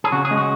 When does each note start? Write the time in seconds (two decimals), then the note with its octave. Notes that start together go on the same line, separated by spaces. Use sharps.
0.04 G#4
0.12 C#3 F#4
0.25 G#4
0.31 G#3
0.37 F#4